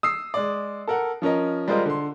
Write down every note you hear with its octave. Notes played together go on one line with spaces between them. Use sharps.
D#6 E6 C7
G#3 D5
A4 A#4 F#5
F3 C#4 A#4 D#5
G3 G#3 F4 A#4 C5 D#5
D3 C6